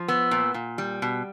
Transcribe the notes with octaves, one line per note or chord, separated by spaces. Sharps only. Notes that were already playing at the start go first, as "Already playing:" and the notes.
Already playing: F3
B3 E6
A#2
A#2
G3
B2